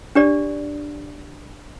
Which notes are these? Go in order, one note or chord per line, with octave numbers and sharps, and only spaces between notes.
D4 G4 D5